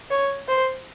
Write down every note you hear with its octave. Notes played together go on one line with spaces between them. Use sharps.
C#5
C5